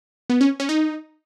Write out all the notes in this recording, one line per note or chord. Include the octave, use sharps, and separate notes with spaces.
B3
C#4
C#4
D#4